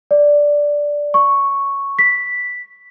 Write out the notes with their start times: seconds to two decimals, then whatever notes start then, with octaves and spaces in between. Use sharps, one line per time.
0.11 D5
1.14 C#6
1.99 B6